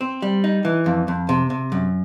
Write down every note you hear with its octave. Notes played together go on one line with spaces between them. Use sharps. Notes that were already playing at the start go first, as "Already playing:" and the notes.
C4
G3
D#4
E3
F2
F2
C3
C3
F#2